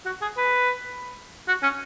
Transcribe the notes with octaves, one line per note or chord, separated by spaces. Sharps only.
F#4
G#4
B4
F#4
C#4